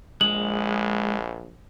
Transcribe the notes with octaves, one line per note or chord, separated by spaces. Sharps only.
A#1 G#3 F#7